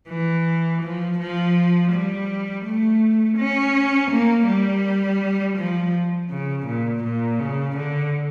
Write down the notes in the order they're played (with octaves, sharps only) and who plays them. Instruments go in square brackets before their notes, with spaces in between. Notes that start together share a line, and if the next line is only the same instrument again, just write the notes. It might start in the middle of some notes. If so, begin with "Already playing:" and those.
[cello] E3
F3
F3
G3
A3
C#4
A#3
G3
F3
C#3
A#2
A#2
C#3
D3